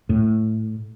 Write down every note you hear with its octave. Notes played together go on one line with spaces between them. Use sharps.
A2